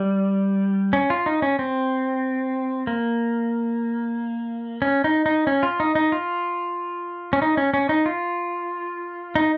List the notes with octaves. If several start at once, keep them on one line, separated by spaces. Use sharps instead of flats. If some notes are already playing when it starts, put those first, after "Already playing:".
Already playing: G3
C#4
F4
D#4
C#4
C4
A#3
C#4
D#4
D#4
C#4
F4
D#4
D#4
F4
C#4
D#4
C#4
C#4
D#4
F4
D#4